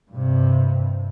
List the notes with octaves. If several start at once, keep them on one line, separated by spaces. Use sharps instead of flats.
G2 C3